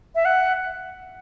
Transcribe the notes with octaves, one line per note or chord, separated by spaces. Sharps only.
E5
F#5